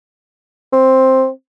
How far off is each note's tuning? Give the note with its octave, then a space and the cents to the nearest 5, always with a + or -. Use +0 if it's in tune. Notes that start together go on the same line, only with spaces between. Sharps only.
C4 +5